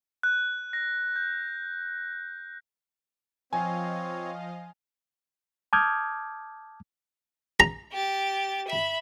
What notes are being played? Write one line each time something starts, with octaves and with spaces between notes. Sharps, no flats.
F#6
A#6
G6
F3 C4 C#5 D#5 F5 G#5
A5 D6 D#6 F6 G6 G#6
A#5
G4 A6
E5 B5